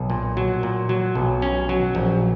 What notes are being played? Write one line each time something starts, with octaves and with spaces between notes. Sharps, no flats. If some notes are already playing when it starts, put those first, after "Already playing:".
Already playing: B1
A#2
F#3
A#2
F#3
B1
C#4
F#3
A#1